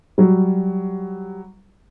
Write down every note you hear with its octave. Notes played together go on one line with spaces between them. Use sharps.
F#3 G3